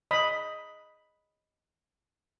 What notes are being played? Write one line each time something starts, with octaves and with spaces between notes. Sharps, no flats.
D#5 B5